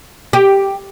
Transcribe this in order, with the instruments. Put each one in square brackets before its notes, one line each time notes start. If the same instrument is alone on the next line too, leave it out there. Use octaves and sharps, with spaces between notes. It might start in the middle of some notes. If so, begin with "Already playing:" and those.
[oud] G4